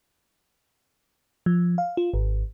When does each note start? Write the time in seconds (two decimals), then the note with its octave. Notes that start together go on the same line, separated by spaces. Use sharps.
1.46 F3
1.78 F5
1.97 F4
2.14 G#1